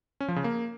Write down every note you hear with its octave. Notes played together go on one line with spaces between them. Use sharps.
C#4
F3
C#3
A#3